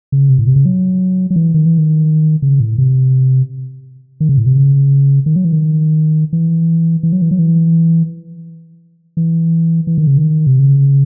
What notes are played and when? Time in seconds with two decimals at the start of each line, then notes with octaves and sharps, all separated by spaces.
0.12 C#3
0.29 C3
0.39 A2
0.47 C3
0.56 C#3
0.65 F#3
1.30 F#3
1.36 E3
1.54 D#3
1.66 E3
1.78 D#3
2.42 C#3
2.60 A2
2.78 C3
4.20 D#3
4.29 C#3
4.38 A2
4.46 C3
4.56 C#3
5.26 D#3
5.36 F#3
5.45 E3
5.53 D#3
6.33 E3
7.03 E3
7.12 F#3
7.22 E3
7.31 F#3
7.39 E3
9.17 E3
9.87 E3
9.98 D#3
10.07 C#3
10.18 D#3
10.47 C3
10.59 C#3